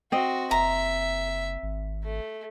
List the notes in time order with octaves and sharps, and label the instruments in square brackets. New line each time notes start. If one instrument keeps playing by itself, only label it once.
[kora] C4 D#5 [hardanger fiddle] F#4
[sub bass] F#1 [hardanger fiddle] E5 [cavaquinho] A#5
[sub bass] G#1
[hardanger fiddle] A3